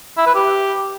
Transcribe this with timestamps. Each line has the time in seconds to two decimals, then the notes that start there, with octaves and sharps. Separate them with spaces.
0.18 E4
0.26 B4
0.35 G4